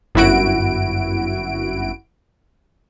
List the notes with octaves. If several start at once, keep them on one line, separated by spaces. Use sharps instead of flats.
G1 F#2 E4 F#4 D7